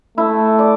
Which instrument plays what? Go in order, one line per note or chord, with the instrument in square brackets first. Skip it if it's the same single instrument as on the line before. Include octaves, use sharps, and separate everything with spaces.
[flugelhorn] A3 [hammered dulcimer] E4
[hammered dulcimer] D5